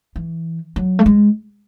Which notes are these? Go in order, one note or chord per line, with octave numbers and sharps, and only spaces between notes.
E3
F#3
A3
G#3